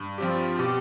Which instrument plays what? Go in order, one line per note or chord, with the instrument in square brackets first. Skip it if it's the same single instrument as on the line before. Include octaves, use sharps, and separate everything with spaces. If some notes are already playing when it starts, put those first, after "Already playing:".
Already playing: [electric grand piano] G2
[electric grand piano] F3 C4 G4 [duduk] F4
[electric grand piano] B2 [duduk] G4